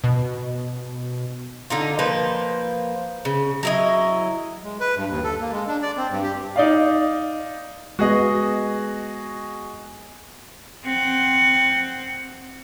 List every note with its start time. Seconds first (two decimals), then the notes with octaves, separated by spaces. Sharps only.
0.04 B2
1.70 D3 D#4 F4
1.99 F3 A#3 B4 C5
3.25 C#3
3.63 F#3 E4 D#5
4.64 G#3
4.80 B4
4.96 G2
5.10 D#2
5.24 A4
5.41 A#3
5.52 G#3
5.67 D4
5.82 D5
5.97 C4
6.10 G2
6.23 G4
6.56 D#4 D5 F5
7.99 G#3 B3 F#4 G#4 D#5
10.85 C4 F#5